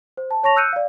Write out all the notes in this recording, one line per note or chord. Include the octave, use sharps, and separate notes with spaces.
C5
A5
C#5 A5 C#6 A#6 F7
E6 F#6 G6 C#7 D#7
D5 F5